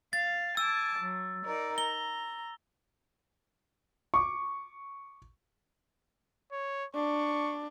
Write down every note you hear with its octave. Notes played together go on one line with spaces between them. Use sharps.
F5 A6
G#5 A5 D6 E6
F#3
D#4 A#4 D5
A#5 G7
C#6 D6
C#5
D4 C#6